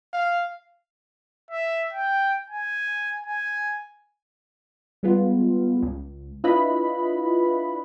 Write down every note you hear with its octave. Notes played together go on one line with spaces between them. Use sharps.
F5
E5
G5
G#5
G#5
G3 G#3 B3 F4
C#2
D4 E4 F4 B4 D#5 B5